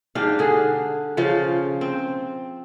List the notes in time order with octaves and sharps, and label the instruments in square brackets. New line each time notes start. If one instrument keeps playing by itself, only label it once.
[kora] G#2 D4 G4 F5
D3 G#4
C#3 F3 F4 F5
C4